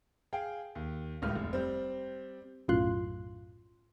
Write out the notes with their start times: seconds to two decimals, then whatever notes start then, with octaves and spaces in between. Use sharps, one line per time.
0.33 G#4 F5 G5
0.75 D#2
1.22 D#1 C#2 A2 F6
1.35 F1
1.53 G3 C4
2.68 B1 F#2 A2 F4 C6 F#6